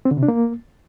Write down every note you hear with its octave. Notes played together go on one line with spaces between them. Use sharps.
C4
D3
C3
D4
A#3